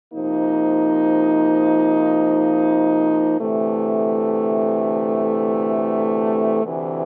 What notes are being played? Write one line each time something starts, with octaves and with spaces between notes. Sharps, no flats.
C3 F3 A#3 D#4
D2 C3 E3 A3
D2 C3 E3